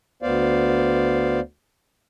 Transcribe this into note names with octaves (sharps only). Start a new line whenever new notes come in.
D2 B3 C5 D5 F5